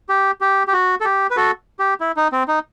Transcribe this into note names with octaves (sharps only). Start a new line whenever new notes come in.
G4
G4
G4
F#4
A4
G4
B4
F#4 A4
G4
E4
D#4
C4
D#4